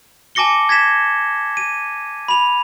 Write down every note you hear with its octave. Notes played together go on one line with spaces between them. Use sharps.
G#5 A5 D6 A#6 C#7 G7
G#6 A#6 B6 E7
D#7
B5 F7